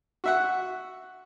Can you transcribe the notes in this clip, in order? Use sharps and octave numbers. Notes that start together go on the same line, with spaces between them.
F#4 E5 F#5